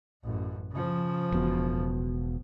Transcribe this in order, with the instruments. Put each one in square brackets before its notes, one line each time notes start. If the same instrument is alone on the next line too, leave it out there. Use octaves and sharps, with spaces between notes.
[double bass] A1 F#2
C#3 F3
[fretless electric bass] E1 B2